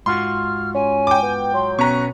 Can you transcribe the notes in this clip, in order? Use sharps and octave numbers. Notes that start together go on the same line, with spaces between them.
G#2 F4 F#4 C6 F6
C#4 G#5
G5 D6
B3
F#3 C6
B2 B3 C#4 A#5 C#6 F#6